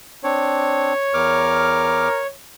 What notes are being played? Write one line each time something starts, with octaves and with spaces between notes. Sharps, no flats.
C4 D4 C#5
E2 A#4 D6 F6